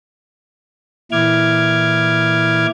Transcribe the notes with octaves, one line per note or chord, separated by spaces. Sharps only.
A#2 E3 E4 D6 F6 G#6